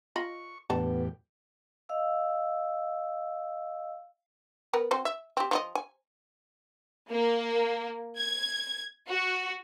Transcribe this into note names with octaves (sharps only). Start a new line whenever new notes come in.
F4 D#5 B5 C#6
E2 A2 D3 B3 G4 A4
D#5 F5 E6
B3 A#4 B4
C4 F#4 C5
E5
C4 G4
F3 C5 D#5
G#5
A#3
G#6
F#4